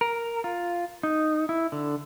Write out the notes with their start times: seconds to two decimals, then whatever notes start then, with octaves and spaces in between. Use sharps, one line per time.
0.01 A#4
0.44 F4
1.03 D#4
1.49 E4
1.72 D3